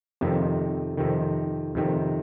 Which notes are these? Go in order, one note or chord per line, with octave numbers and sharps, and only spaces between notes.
F2 C3 D#3
F2 C3 D#3
F2 C3 D#3